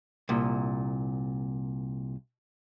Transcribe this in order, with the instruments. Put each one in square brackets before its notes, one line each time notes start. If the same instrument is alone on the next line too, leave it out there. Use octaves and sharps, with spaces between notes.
[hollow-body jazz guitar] C2 A#2